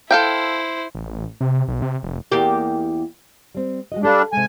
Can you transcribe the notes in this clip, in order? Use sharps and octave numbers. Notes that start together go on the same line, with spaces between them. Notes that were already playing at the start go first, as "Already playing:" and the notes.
E4 A4 C5 F5 G5
A1
C3
B1
C3
F1
E2 A#3 G4
G3 C4
G#3 F#4 D#5
G3 D4 G4 A4 F5
C3 G#3 G#5